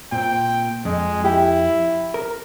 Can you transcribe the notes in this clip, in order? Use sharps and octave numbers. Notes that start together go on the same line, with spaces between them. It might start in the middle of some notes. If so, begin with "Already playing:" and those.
A#2 C4 G5
F2 G#3
E4 G4
A#4